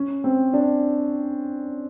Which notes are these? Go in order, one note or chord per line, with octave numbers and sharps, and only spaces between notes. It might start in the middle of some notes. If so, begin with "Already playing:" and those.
Already playing: C#4
C4
D4